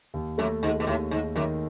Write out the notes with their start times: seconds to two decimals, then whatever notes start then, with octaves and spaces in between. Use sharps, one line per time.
0.14 D#2
0.38 F#2 A3
0.62 D#2 G#2
0.80 B2
0.87 D#2 A2
1.11 D#2 G#2
1.36 F#2 D#3